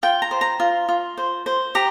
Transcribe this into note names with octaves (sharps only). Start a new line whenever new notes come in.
F4 G5
A#5
C5
A#5
F4
F4
C5
C5
G4 A#5